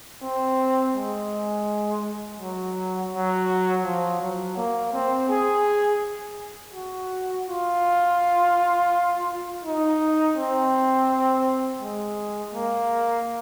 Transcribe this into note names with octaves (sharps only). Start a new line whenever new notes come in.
C4
G#3
F#3
F#3
F3
F#3
A#3
C4
G#4
F#4
F4
D#4
C4
G#3
A#3